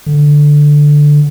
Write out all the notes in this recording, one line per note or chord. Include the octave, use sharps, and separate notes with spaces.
D3